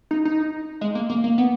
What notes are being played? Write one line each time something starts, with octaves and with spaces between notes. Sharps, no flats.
D#4
D#4
G#3
A#3
A#3
A#3
B3